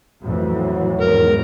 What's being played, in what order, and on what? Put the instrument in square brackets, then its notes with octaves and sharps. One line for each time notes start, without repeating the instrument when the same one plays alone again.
[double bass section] F2 A2 E3 [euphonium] F#3
[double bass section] E2 G#2 D#3 [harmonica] A#4